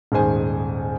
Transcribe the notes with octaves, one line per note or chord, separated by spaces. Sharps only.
D#1 G#2 D#3 C5 G#5